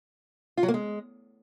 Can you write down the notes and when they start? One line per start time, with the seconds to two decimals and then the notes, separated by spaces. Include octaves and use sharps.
0.57 F4
0.63 F#3
0.68 A#3
0.74 G#3